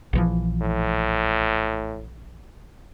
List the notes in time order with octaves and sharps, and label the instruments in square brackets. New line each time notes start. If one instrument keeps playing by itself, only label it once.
[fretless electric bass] A#1 E3 F3
[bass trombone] A2